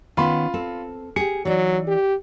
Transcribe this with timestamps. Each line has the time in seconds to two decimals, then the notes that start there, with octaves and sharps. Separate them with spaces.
0.17 D#3 B3 C#4 F4 B5 C6
0.54 C4 A4
1.16 G4 G#4 C#7
1.45 E3 F#3 D#4 D5
1.87 G4